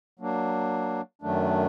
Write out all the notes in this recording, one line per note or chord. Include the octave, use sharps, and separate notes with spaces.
F#3 A#3 D4
F#2 D#3 F#3 A3 D4